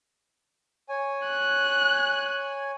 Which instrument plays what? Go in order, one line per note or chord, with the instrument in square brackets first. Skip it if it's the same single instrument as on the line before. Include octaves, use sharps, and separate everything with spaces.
[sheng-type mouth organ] C#5 G#5
[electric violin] F#6